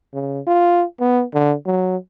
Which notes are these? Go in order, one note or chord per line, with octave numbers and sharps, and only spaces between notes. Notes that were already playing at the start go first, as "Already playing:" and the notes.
C#3
F4
B3
D3
F#3